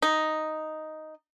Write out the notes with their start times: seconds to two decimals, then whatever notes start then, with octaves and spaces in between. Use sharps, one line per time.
0.02 D#4